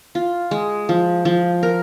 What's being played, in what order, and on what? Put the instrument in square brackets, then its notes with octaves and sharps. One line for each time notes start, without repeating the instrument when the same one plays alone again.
[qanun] F4
G#3
F3
F3
A#4